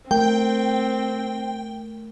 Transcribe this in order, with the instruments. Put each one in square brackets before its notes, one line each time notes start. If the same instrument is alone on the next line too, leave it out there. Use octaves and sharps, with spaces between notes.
[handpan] A3 A#4 [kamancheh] C4 [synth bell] G5